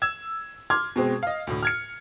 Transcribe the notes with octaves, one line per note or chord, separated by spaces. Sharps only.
E6 G#6 E7
C6 D6 F6 G#6
B2 G#3 C4
D#5 F5
D2 A2
F6 G#6 C#7